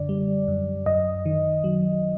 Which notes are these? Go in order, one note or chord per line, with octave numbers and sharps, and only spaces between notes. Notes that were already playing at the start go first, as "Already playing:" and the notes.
Already playing: F#2 D3 D5
G3
F#2
F#2 D#5
D#3
F#3